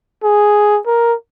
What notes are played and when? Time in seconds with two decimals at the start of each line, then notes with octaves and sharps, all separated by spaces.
0.23 G#4
0.86 A#4